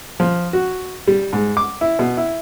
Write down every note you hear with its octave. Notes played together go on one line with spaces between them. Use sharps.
F3
F#4
G3
G#2
D6
E4
B2
E4